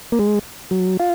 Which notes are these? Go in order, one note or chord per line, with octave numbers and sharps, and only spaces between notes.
A#3
G#3
F#3
F4